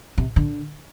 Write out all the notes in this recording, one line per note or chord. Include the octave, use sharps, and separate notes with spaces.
C3
D3